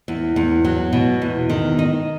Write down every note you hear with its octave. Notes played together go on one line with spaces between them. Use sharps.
E2
E2
F#3
B2
E2
D#3
D#4